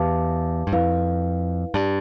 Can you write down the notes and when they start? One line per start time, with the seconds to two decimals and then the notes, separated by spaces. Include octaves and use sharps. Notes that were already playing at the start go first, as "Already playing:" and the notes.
Already playing: E2 G4 B4 F5 A5 D6
0.67 G2
0.72 F2 E4 B4 F5
1.74 G2 G4 D5 A5